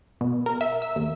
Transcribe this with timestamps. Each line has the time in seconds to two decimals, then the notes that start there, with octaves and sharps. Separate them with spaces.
0.21 B2
0.46 A#4
0.61 E5
0.82 E6
0.96 D#2